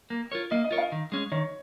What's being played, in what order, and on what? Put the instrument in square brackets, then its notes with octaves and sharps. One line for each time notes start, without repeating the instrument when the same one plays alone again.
[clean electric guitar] A#3
F4 A#4 C#5
[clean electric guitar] A#3 [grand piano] D#5
[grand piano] D#5
[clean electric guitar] F4 A#4 C#5
[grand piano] F5
[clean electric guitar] D#3
G#3 C#4
[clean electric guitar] D#3 [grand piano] C#5